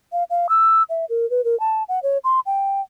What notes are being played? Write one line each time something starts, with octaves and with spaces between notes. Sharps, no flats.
F5
F5
E6
E5
A#4
B4
A#4
A5
F#5
C#5
C6
G5